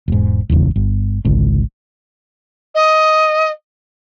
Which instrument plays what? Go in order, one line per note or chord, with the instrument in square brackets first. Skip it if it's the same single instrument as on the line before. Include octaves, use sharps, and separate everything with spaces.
[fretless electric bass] E1 G#2
D#1 G#1 E2 C#3
G1
G#1 C#2 D3
[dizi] D#5